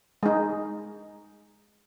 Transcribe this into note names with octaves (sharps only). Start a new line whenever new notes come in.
G#3 D#4